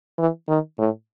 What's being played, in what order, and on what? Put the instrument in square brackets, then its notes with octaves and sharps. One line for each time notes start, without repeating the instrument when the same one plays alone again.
[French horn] E3
D#3
A2